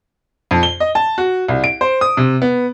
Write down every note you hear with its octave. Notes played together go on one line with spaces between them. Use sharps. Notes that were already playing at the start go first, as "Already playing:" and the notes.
F2
G7
D#5
A5
F#4
C2
D7
C5
D#6
C3
B3